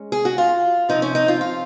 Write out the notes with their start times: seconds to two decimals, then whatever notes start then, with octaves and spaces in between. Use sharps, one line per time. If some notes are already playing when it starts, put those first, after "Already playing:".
Already playing: G#3 C#4
0.12 G#4
0.25 F#4
0.38 F4
0.89 C3 F3 C4 D#4
1.02 C#4
1.15 D#4
1.28 F4
1.41 F4